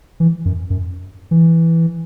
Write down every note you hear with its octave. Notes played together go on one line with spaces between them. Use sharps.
E3
F#2
F#2
E3